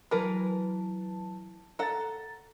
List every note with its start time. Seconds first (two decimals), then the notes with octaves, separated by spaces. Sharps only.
0.11 E3 F#3 A#4 B4 A5
1.79 A4 F#5 A#5 A6